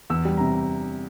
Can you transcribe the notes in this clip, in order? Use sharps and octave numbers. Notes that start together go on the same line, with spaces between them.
E2 E6
G3
C3 A#5